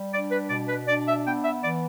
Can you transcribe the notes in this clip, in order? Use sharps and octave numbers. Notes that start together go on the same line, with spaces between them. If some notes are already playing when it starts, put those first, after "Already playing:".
Already playing: G3
D4 D5
B4
B2 D5
B4
D4 D5
E5
B3 G5
E5
E3 D5